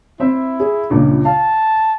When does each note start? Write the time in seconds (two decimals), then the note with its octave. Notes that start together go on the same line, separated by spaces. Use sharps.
0.20 C4 E4 E5
0.60 G#4
0.90 C#2 G2 A#2
1.25 F5 A5